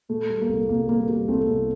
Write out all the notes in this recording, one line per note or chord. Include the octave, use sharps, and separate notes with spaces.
A#2 A3
G3
A#3
C2 A3
C2 A#3
G3 A#3
G3 A#3
C2 A3 C4
C2